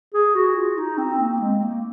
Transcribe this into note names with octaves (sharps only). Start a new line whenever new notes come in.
G#4
F#4
F4
D#4
C4
A#3
G#3
A#3